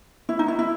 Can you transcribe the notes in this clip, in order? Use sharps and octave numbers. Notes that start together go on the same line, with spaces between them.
E4
D#4
E4
E4